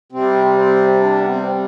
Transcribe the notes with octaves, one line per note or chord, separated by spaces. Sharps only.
C3 G3 C4
C4
D4
B3
C4